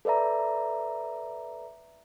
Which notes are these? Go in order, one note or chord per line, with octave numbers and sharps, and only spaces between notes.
A4 B4 D5 E5 A#5